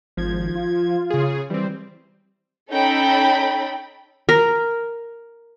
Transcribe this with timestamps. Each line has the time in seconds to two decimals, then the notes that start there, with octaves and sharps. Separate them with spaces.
0.17 G#1 F3 G#6
0.55 F4
1.10 C#3 G#4
1.50 E3 G3 C4
2.72 C#4 D#4 A4 G5 B5
4.29 A#4